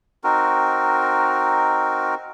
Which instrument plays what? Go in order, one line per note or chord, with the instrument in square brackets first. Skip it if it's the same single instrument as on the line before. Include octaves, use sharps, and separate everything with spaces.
[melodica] C4 D#4 F#4 A#4